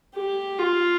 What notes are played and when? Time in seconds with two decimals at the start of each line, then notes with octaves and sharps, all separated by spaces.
0.14 G4
0.58 F4